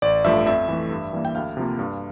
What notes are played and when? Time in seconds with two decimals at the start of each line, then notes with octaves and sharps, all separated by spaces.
0.02 A1 D5
0.24 G2 F3 A3 E5
0.46 F2 E5
0.68 E3 A3
0.91 G2
1.13 E3 G3 A#3
1.25 G5
1.35 D2 F5
1.57 C3 F3 A#3
1.79 G2